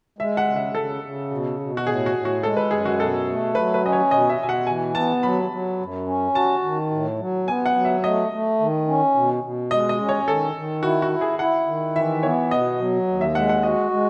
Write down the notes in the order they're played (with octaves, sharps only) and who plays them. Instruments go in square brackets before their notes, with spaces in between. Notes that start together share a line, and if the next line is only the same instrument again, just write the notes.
[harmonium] G#3 [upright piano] E5
[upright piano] F#5
[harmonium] C#3
[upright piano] E5
[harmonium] C#3 [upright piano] A4
[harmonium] C#3
B2
B2
[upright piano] F#4
[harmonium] A2 [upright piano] G#4
[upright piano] F#4
[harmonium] A2
[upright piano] F#4
[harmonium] G#3 [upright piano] A4
[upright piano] B4
[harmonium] F#2 [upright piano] G#4
[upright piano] F#4
[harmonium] B2 [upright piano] A4
[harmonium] A3
[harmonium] F#3 [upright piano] B4
[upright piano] B4
[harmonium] C#4 [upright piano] D#5
[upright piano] C#5
[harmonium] B2 [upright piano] D#5
[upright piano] E5
[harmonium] B2 [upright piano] G#5
[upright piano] F#5
[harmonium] E3 [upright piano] G#5
[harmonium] B3 [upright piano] A5
[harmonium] F#3 [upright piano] B5
[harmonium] F#3
F#2
C#4
[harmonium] F#4 [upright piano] A5
[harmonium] D#3
A2
F#3
[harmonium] B3 [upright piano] G#5
[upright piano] F#5
[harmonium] F#3
[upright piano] E5
[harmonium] A3 [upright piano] D#5
[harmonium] A3
D#3
C#4
B2
B2
[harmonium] G#3 [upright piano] D#5
[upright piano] D#5
[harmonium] C#4
[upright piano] C#5
[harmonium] D#3 [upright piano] A4
[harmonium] D#3
[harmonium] E4 [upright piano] F#4
[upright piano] F#4
[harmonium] E4
[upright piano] G#4
[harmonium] E4 [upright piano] F#5
[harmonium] D#3
[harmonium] E3 [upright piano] E5
[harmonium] B3 [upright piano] C#5
[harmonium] B2 [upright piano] D#5
[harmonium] F#3
D#2
[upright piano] E5
[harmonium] G#3 [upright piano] F#5
[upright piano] F#5
[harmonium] F#4 [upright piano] D#5
[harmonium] G#3